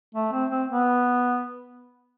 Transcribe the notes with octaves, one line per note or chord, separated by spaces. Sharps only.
A3
C4
C4
B3